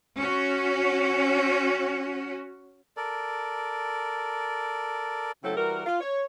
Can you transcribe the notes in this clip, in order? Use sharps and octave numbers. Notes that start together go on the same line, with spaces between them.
C#4 F#4
A4 A#4 D5
C#3 F#3 A3 C4 E4 A4
E3 G3 F#4 A#4
F4
C#5